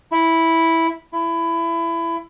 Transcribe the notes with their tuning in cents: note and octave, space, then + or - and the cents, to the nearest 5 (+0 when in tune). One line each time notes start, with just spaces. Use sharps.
E4 -5
E4 +20